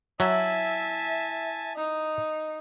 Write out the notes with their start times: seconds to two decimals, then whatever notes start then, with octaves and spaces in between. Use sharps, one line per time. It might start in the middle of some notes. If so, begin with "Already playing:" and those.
0.20 F#3 E4 E5 G#5 A5
1.76 D#4